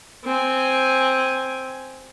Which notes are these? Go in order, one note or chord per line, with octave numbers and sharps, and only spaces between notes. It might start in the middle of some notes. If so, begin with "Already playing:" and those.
C4 G#5